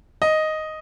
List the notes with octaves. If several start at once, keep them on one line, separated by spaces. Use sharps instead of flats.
D#5